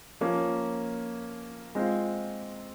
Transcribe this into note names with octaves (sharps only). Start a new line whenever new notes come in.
F3 A#3 C#4
G#3 C4 F4